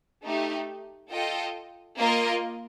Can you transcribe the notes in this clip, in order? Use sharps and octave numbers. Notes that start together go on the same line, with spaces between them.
A3 D#4 G4
F4 A4 D#5 G5
A#3 F4 A#4 D#5